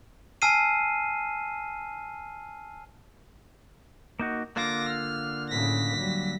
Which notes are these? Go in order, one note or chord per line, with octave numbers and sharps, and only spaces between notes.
G#5 A5 E6 F6 C7 D#7
A#3 D#4 F#4
D3 A#3 F4 D6 A#6
F6
A2 C#3 A#6 B6
F#3 G3